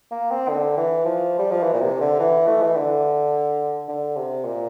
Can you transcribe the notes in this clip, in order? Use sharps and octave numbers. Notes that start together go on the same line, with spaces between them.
A#3
C4
D3
E3
F3
G3
F3
E3
A#2
C3
D3
E3
A3
E3
D3
D3
C3
A#2